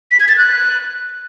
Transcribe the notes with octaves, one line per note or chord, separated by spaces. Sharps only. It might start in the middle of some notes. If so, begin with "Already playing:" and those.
B6
G#6
A6
F#6